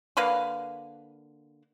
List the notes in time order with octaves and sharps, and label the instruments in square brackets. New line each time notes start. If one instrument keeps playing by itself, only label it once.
[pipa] D3 A#3 B4 F5